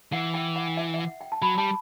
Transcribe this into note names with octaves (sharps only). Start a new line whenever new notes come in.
E3 F#5
G5
F#5
E5
E5
F#5
G5
A5
F#3 B5
G3 A5